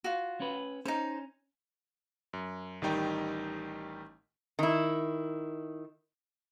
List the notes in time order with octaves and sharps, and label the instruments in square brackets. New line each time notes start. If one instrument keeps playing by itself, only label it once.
[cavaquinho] F4 F#4
[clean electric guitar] C#4 B4
[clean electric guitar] C#4 [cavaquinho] D#4 C5
[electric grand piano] F#2
A1 D#3 G3 D#4 G5
[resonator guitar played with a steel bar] D#3 E4